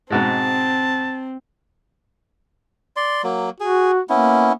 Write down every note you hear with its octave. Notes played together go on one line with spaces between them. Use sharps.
G#2 B2 G#3 C4 A5
D5 C6
F#3 A#3
F#4 G#4
A#3 B3 C#4 E4